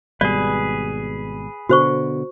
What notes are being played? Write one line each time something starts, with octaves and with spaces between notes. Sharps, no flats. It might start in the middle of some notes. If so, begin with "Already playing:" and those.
G#1 B2 G3 G#4 B4 D5
B2 D3 F#4 C5 C#6